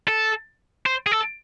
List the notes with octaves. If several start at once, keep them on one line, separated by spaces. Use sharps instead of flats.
A4
C5
G#4
A4